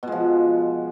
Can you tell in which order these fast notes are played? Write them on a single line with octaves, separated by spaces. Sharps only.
B2 G#3 F3